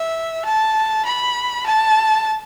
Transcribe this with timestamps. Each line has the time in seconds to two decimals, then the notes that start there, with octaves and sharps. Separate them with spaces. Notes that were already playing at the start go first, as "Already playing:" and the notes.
Already playing: E5
0.45 A5
1.05 B5
1.66 A5